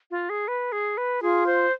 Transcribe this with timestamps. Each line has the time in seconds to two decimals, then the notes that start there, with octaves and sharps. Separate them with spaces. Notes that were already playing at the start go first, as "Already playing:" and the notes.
0.11 F4
0.30 G#4
0.48 B4
0.72 G#4
0.97 B4
1.22 F4 G#4
1.46 C5